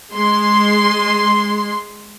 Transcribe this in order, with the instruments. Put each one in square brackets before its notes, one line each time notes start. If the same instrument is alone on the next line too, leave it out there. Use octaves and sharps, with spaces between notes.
[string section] G#3 C6